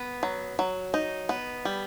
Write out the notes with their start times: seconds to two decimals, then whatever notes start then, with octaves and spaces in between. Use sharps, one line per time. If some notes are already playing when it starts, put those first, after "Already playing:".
Already playing: B3
0.23 F#3
0.59 F#3
0.94 D#4
1.29 B3
1.65 G3